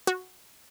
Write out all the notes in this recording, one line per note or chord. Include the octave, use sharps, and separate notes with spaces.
F#4